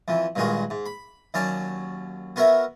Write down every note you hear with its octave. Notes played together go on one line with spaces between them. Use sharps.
F2 E3
G2 A#2 D#3 G#3 F#4
G#2
B5
D#2 F#3 C#4 D5 A5
B3 F#4 A#4 C#5 E5